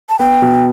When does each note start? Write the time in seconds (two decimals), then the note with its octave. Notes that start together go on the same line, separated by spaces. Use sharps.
0.09 A5
0.19 B3 G5
0.42 B2